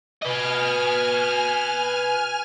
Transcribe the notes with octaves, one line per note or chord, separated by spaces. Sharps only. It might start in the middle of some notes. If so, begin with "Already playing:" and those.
B4 D#5 G#5 F6